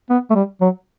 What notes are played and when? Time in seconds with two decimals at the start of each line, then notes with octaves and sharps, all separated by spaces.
0.10 B3
0.30 A3
0.35 G3
0.61 F#3